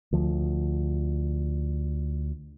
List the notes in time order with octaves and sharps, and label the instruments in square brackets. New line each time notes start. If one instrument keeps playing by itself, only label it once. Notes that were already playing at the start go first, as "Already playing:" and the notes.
[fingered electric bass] D2 F3